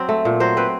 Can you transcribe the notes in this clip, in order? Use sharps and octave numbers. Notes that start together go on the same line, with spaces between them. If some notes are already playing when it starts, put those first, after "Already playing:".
Already playing: F#3 C4
A3
A#2
F#3 C5
C4 B4